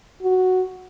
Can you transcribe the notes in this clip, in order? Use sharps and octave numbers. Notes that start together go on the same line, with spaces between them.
F#4